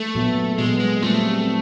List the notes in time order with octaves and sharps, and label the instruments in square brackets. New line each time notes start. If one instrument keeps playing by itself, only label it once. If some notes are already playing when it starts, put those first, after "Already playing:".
Already playing: [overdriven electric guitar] A3
[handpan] A#2 F#3 B3
[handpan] A#2 F#3 B3 [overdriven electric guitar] G#3
[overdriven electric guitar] G#3
[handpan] G3 C4 F4 A4 [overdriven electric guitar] A3
[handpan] G3 C4